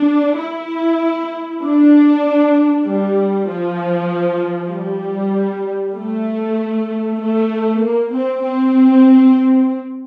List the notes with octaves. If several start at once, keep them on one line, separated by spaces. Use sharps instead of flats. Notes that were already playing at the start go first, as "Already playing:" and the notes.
Already playing: D4
E4
D4
G3
F3
G3
A3
A3
A#3
C4
C4